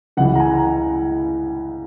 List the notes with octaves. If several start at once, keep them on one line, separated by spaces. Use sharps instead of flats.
C#2 C#3 E3 F#5
A#5
G#5